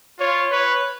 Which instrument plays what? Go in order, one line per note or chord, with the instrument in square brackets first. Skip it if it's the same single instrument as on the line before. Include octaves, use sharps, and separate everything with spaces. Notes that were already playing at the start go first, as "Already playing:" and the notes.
[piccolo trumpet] F4 [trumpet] C#5
[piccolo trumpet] B4 [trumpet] C#5